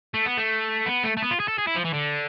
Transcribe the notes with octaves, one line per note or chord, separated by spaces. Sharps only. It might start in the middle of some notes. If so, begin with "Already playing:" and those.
A3
B3
A3
B3
A3
A3
B3
F4
G#4
A4
G#4
E4
F3
E3
D3